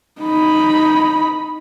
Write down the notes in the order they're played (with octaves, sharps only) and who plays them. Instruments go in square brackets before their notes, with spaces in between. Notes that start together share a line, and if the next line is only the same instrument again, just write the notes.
[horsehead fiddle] D#4 B5